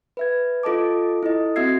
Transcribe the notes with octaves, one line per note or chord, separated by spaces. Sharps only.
B4 E5 G#6
F4 A4 D#5 A5 D6
E4 A4 D#5
C4 F#4 E5 E6 G#6 C7